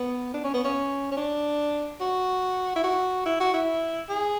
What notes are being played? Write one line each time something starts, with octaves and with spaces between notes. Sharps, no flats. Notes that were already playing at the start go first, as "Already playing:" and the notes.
Already playing: B3
D4
C#4
B3
C#4
C#4
D4
F#4
E4
F#4
E4
F#4
E4
G#4